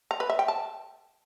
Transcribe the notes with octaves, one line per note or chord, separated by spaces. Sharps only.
A#5
B4
E5
G5
A5